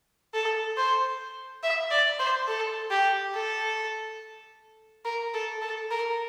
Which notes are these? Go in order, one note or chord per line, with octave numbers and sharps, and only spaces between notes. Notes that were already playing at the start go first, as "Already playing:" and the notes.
A4
C5
E5
D5
C5
A4
G4
A4
A#4
A4
A4
A#4